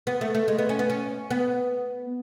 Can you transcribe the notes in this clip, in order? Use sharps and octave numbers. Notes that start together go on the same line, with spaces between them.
B3
A3
A3
G#3
B3
C#4
B3
C#4
B3